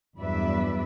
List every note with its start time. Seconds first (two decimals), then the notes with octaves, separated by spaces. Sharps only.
0.18 E2 G2 F#3 B4 D5 E5